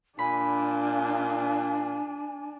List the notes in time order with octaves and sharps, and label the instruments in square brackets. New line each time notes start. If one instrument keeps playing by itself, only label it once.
[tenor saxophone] A#2 [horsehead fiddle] D4 [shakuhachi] G#5 [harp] B5